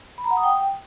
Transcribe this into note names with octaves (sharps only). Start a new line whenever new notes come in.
B5
A#5
F#5
D#6
G5